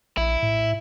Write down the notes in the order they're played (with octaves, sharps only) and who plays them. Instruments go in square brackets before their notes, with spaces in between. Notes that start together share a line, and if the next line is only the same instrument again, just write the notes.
[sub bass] A#1 [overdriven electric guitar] E4
[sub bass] A2